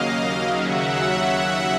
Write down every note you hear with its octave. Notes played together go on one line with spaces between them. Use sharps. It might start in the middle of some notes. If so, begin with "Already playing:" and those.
Already playing: D#2 C#3 F#3 A#3 D#5 F5
D#2 C#3 F#3 E5 F#5
E5 F#5